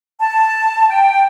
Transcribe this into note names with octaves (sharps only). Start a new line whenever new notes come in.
A5
G5